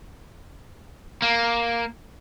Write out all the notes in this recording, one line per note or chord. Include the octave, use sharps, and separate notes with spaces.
A#3